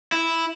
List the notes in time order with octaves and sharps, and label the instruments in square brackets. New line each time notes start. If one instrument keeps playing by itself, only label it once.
[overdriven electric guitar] E4